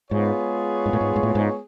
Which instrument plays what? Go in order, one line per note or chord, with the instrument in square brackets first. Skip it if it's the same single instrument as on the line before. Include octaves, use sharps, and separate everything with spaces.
[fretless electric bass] G#2 [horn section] G#3 B3 F4 G#4 C#5
[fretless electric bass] G#2
A2
G#2
G#2
A2
G#2